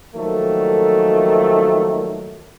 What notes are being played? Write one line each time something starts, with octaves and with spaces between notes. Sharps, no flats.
D#3 F3 F#3 A3 A#3 A4